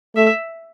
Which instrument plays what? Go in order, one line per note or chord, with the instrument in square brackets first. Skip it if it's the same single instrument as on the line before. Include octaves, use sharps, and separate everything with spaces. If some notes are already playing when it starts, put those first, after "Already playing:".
[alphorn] A3 [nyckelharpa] E5